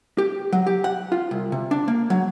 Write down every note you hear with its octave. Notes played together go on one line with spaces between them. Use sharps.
G4
F#3
G4
F#5
F4
C2
C3
D4
A#3
F#3